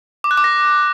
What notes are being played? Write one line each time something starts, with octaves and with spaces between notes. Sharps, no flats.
D6
F#6
D6
A#6